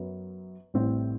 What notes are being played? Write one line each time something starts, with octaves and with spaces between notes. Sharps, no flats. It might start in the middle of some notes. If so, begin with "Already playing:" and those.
Already playing: F#2 F#3 B3
A1 A2 G3 C4